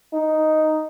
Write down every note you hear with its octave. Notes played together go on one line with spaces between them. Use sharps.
D#4